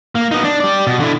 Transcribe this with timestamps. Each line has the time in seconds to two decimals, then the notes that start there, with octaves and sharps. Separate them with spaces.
0.15 A#3
0.31 B3 D#4
0.44 D4
0.60 G4 D5
0.87 B2
1.00 D3 E4